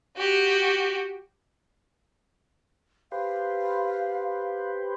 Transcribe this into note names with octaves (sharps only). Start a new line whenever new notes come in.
F#4 G4
G4 B4 C5 F5